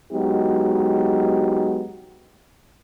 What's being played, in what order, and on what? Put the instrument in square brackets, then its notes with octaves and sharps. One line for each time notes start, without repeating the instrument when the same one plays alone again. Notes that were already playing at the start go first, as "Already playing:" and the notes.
[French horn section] F#3 G#3 B3 D#4 F#4 G4